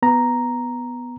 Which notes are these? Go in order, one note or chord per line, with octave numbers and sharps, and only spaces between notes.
B3 A#5